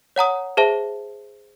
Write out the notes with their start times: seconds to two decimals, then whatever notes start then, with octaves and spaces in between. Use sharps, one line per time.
0.16 C#5 F#5 A#5 D#6
0.57 G#4 C5 E5 A5